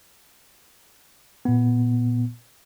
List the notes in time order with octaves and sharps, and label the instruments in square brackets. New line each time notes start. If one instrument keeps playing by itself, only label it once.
[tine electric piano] A#2 B3